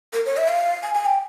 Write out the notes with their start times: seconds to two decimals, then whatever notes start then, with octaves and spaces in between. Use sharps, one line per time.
0.13 A#4
0.26 C#5
0.37 E5
0.48 F5
0.83 G#5
0.94 G#5
1.05 G5